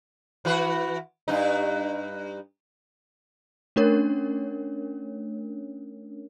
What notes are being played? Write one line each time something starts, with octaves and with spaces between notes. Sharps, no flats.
E3 F#4 B4
G2 D#4
A3 C#4 D4 A#4 C#5